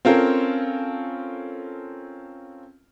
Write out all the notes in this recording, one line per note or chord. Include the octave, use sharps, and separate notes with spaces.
C4 C#4 F4 A4 A#4